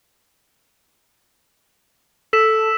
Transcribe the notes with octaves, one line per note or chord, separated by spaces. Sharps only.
A4 E6 B6 E7